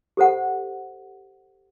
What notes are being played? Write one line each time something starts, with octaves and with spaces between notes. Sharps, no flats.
G4 A4 C5 F#5